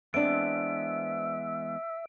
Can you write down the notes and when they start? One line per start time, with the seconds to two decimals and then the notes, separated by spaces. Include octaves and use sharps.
0.14 E3 G#3 B3 C4 D4 E5 D7